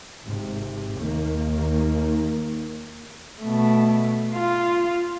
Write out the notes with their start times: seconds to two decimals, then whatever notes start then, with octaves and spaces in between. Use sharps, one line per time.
0.25 G#1 G#2 C3
0.99 D#2 D#3 A#3
3.41 B2 A3
4.35 F4